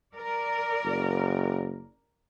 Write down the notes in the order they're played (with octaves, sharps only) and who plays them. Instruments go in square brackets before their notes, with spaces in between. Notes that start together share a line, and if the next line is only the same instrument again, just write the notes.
[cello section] A#4 D5
[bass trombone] F#1